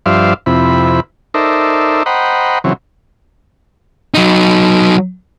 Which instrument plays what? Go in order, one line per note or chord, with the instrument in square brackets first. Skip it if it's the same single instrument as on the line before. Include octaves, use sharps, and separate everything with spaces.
[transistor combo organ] G2 F3 C5 D5 E5 F5
F2 C3 E4 B5
D#4 A4 A#4 C5 D5 E5
C5 D#5 F#5 G5 A#5 B5
C#3 E3 F#3 C4
[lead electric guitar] F#3 D#4